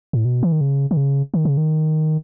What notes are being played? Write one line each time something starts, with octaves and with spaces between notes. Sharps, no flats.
A2
B2
E3
D#3
C#3
D#3
C#3
D#3
C#3
D#3